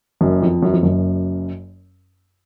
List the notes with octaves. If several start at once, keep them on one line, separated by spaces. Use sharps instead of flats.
F#1 F#2
F2
F#2
F2
F#1 F#2